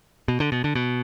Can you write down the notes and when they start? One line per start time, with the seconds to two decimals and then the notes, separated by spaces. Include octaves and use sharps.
0.28 B2
0.40 D3
0.52 B2
0.64 D3
0.75 B2